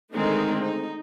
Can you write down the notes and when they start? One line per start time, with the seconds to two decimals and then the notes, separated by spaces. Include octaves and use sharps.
0.13 D3 D#3 G#3 A3 C4 D#4
0.60 D#4